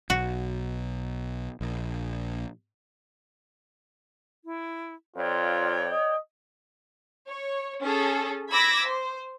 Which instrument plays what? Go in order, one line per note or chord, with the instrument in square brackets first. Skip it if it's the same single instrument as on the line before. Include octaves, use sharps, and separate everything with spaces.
[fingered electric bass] B1 [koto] F#4
[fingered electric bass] A#1
[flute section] E4
[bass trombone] F2 [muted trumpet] F4 [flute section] C#5 D5 G5
[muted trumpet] D#5
[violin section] C#5
C#4 G#4 A4
B5 D6 E6 G#6 A#6 B6
C5